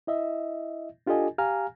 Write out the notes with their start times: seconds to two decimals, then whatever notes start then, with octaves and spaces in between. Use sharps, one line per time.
0.07 E4 D#5 E5
1.07 D4 F4 G4 A4 D#5 G#5
1.38 G4 F5 G#5 A#5 F6